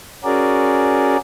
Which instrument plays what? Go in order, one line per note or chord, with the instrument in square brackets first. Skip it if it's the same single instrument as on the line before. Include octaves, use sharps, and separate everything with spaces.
[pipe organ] C#4 F#4 G#4 A#4 D5